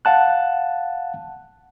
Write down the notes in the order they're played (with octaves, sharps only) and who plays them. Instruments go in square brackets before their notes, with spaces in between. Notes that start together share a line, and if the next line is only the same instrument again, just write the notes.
[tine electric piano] F5 F#5 A5 F#6